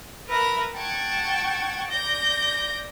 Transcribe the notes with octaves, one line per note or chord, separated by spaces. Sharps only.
A#4 B4 E5 B5 A#6
F#5 G5 A5 C#6 G#6
D5 G6 A#6